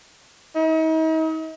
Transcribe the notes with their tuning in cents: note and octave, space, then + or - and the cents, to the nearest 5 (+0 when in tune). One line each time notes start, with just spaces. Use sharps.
D#4 +40